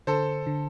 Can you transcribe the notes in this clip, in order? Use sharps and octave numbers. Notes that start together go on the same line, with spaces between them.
D3 A4 C5
D3